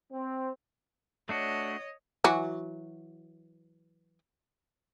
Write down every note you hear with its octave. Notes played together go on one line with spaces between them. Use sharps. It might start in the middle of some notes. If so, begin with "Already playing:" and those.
C4
A3 D4 F#4 C#5 D#5
E3 F#3 F#4